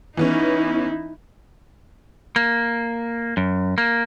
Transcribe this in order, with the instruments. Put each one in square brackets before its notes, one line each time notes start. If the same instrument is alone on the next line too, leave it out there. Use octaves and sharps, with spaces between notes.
[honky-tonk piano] E3 B3 C#4 [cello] D#4 E4
[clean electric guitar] A#3
F#2
A#3